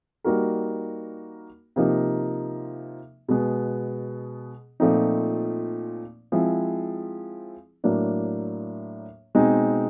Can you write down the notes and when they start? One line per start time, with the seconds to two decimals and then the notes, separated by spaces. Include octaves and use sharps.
0.24 G3 A#3 D#4 F#4 A#4
1.76 C3 F3 A#3 D#4
3.28 B2 G#3 B3
4.80 A#2 F3 A3 C4 D#4
6.32 F3 G#3 C4 E4
7.84 A2 F#3 A#3 D4
9.35 B2 G#3 C4 D#4